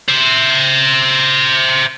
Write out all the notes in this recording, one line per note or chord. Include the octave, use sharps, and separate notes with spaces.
C5 E5